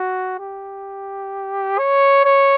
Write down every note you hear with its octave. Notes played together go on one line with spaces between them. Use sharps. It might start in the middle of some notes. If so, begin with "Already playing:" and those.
Already playing: F#4
G4
C#5
C#5